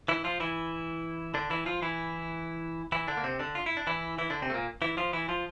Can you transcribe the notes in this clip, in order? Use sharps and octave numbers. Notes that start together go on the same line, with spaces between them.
E3 E4
F3 F4
E3 E4
D3 D4
E3 E4
F3 F4
E3 E4
E3 E4
D3 D4
A#3
C3 C4
D3 D4
F4
E4
D4
E3 E4
E3 E4
D3 D4
C3 C4
A3
A#2 A#3
E3 E4
F3 F4
E3 E4
F3 F4